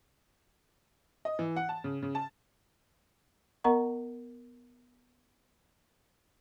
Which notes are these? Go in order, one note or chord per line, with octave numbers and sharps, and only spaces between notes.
D#5
E3
F#5
A5
C#3
C#3
A5
B3 A#4 D#5 F#5 A#5 C#6